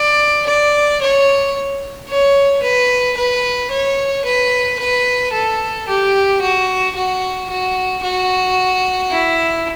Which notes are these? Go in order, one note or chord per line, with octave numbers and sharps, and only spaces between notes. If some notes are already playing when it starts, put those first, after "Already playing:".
Already playing: D5
D5
C#5
C#5
B4
B4
C#5
B4
B4
A4
G4
F#4
F#4
F#4
F#4
E4